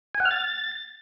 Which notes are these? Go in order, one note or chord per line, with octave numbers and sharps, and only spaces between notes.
G#5
F#5
F6
A6